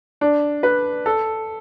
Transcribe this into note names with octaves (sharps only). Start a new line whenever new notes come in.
D4
B4
A4